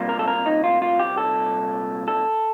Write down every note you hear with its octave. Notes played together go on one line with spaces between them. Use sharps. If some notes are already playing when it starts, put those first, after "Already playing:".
Already playing: C2 A#2 G3 A#3
A#4
A4
A#4
D#4
F4
F4
G4
A4
A4